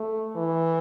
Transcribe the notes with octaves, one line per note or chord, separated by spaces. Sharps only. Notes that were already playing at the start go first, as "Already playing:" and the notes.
Already playing: A3
E3